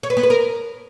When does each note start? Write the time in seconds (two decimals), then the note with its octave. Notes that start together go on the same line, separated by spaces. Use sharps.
0.03 C#5
0.10 B4
0.17 B3
0.23 B4
0.30 A#4